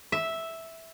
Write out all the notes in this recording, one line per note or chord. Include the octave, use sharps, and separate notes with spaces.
E5